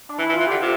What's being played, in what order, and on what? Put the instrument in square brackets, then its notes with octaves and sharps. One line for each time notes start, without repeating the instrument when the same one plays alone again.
[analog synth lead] D4
[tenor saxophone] E3 [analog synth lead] E4
[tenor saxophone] E3
[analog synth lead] F4
[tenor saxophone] E3
[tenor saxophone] D3 [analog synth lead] G4
[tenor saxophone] C3 [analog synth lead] F4